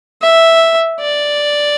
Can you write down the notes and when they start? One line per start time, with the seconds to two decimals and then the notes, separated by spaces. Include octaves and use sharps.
0.22 E5
1.00 D5